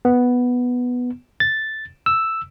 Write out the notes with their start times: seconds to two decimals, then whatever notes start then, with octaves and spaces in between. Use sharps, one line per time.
0.05 B3
1.40 A6
2.06 E6